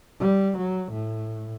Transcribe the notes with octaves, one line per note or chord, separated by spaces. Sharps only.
G3
F#3
A2